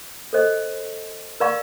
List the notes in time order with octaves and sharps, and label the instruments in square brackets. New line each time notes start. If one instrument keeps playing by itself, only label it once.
[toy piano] A4 C5 D#5
A#4 D5 F5 A#5 C#6